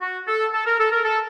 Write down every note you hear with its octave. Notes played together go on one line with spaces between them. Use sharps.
F#4
A4
A4
A#4
A4
A#4
A4